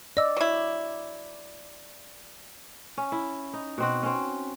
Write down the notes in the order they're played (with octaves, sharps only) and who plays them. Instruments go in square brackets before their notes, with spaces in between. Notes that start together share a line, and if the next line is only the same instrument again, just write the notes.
[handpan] D5 [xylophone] D#5 E6
[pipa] F#3 E4
[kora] C#4
E4
D#4
B2 C4 F#4
C4 C#4